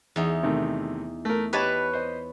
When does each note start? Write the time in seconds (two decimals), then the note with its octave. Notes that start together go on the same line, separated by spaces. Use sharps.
0.16 E2 D#4
0.43 C3 D#3 A3
1.25 A3 A#4
1.53 G4 B4 C#5 D#5 A5 B5
1.94 C5 D#5